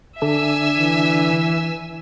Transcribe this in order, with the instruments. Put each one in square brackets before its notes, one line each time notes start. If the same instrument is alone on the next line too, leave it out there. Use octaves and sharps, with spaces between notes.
[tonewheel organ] D3 D4 [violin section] E5 G#5 E6
[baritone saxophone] E3